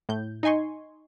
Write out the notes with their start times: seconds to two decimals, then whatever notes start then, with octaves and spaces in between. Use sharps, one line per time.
0.09 A2 G6
0.43 D#4 D#5 G#5 C6 C#6